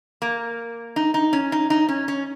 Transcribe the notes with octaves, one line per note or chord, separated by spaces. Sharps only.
A#3
D#4
D#4
C#4
D#4
D#4
C#4
C#4